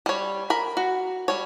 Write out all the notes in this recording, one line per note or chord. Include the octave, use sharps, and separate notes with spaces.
G3 C#5
A#4 B5
F#4
G3 C#5